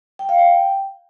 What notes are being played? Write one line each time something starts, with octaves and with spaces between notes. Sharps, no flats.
G5
F5
G5